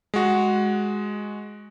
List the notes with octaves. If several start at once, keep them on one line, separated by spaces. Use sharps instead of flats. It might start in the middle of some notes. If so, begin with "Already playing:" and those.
G#3 F#4